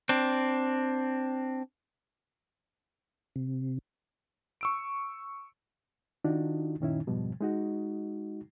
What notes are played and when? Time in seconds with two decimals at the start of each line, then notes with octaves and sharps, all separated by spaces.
0.09 C4 D4
3.36 C3
4.61 C#6 E6 D7
6.24 D#3 D4 D#4 F4 F#4
6.80 F#2 A#2 D#3 C#4 D#4 E4
7.07 F2 G#2 B2 F3 G3
7.41 G#3 D#4 F#4